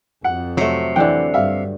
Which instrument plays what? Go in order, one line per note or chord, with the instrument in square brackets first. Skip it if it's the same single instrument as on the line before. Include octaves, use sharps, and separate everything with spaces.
[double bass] F2 [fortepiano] F#5
[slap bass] C3 [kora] F#3 A3
[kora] D3 D4 F#5 [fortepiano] E3 G5
[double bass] G2 [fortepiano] E5 F5